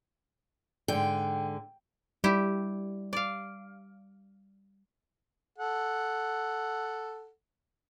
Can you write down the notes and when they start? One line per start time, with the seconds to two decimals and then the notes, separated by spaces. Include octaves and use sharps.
0.88 G#2 D3 G5
2.24 G3 E4 G4
3.13 D5 F5
5.58 A4 F#5